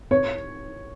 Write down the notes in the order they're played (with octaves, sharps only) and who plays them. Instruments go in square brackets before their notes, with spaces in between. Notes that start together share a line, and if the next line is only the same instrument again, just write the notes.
[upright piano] C#5